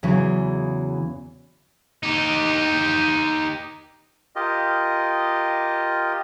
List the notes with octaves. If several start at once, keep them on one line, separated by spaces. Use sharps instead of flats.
E2 C#3 E3 F#3
D#4 G4
F4 G4 A#4 D#5